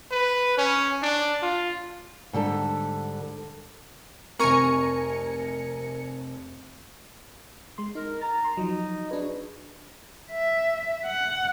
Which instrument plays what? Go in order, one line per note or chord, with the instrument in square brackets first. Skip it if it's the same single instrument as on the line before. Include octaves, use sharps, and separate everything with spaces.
[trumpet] B4
C#4
D4
F4
[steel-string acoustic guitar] G#2 D3 G3 A4
[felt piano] F1 C4 [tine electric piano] A#4 [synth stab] G#5 A#5 C#7 [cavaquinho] C#6
[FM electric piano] G#3 C6
[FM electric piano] D#4 [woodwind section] A#4
[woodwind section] A#5 [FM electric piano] A6
[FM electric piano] C6
[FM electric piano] F3 F#3 [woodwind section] D#4 D#5
[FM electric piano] D4 B4 [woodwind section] F#4 G#4
[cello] E5
F#5